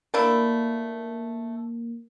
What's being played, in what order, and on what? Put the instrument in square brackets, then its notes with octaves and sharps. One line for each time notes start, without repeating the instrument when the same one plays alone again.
[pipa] A3 D4 E4 [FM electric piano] A#3